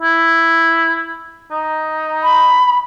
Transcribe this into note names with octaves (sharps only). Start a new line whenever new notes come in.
E4
D#4
B5